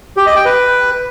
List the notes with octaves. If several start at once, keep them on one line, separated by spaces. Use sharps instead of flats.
G4
D#5
G5
B4